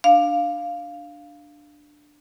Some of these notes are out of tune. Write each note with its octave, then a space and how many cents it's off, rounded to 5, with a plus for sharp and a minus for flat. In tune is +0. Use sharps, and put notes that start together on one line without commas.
D4 +10 F5 +0